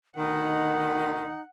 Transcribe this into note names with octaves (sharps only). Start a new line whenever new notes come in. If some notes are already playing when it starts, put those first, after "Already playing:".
D2 B2 D#3 D#4 F#5